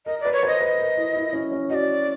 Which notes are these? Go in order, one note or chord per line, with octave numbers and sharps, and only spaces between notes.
A#4 D#5
B4 D5
C#5
C5 D#5
B4
A#4
E4
E4
C#4
C#4
F#4 D#5
D5